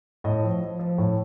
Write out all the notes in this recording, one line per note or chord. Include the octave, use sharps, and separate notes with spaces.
A2 D#5
F3
F3
F3
A2